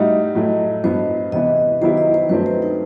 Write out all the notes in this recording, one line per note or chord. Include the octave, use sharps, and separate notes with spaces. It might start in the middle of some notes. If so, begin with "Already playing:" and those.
Already playing: A2 G3 D#4 F#4 D#5 E5
A2 F#3 A3
G2 F#3 B3 C5
C3 E3 B3 E4 D#5
D#3 F#3 B3 E4 G4 C5
D#5
C5
G2 F#3 A3 C4 B4
C5
D#4